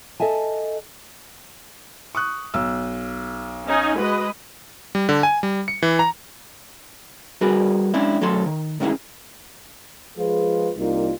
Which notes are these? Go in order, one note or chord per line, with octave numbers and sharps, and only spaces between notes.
A4 D#5 E5 G#5 A5
C#6 D#6 F#6
B1 E6
C#4 D#4 G#5
G#3 F#4 B4 D#5
G3
D3
G#5
G3
C#7
E3
A#5
G3 F#4 G#4 A#4 B4
G#3 C#4 D4 E4
B1 F#3 A3 C#4 A4 C6
D#3
G#2 C#3 E3 C#4 E4 G#4
F3 G#3 F4 G#4 B4
C2 G3 A#3 D#4 F4